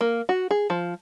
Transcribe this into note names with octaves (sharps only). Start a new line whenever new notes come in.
A#3
F#4
G#4
F3